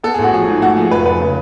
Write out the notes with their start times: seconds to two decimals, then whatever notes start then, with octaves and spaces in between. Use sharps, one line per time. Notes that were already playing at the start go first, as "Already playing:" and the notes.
0.03 B3 A4
0.14 A1 G#4
0.24 F#4
0.33 F3 G#4
0.47 G#2
0.62 A3 F#4
0.76 F3 G#4
0.91 F1 B4
1.05 F3 B4
1.20 C#3